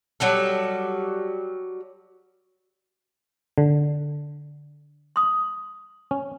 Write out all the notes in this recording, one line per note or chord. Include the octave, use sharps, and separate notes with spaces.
F#3 G3 A4
D3
C6 D#6
C#4